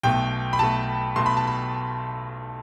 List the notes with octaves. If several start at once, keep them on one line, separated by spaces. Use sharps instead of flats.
B1 B2 A3 G5
B5
B1 B2 A3 A5
B1 B2 A3 C6
B5
A5
B5